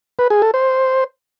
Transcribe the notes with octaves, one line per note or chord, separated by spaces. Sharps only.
B4
G#4
A4
C5